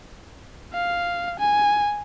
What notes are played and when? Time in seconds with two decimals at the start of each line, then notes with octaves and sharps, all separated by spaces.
0.74 F5
1.40 G#5